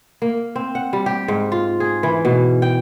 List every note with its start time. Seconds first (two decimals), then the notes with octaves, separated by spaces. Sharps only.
0.22 A#3
0.56 C4
0.75 F#5
0.93 G3
1.06 G4
1.28 G#2
1.52 F4
1.80 G#4
2.03 E3
2.25 B2
2.62 G5